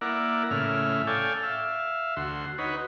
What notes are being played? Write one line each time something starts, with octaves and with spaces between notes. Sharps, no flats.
A#3 E4 A#4 D5 F#5
A2 C#3 E4 F6
A4 C#5 D5 F5 G5 G#5
E5 F5
D2 F#4 C6
D#4 F#4 B4 C#5